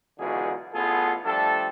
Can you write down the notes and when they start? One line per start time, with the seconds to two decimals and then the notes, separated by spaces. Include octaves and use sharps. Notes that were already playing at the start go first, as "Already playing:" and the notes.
0.19 C#2 B2 D3 E3 F#3 G#4
0.74 A1 B3 F4 G#4 A4
1.25 F3 G3 A3 D4 A4